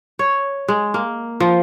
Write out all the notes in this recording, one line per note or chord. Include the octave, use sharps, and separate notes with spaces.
C#5
G#3
A#3
F3